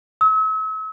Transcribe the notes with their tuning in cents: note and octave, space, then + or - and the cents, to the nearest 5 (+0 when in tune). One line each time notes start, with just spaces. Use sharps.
E6 -40